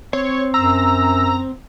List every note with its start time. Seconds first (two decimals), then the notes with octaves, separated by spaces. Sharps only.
0.13 C4 C#5
0.54 F#2 A#5 E6